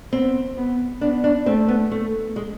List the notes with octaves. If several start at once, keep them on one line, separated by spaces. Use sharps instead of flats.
B3 C4
B3
B3 D4
D4
A3 C4
B3
A3
G#3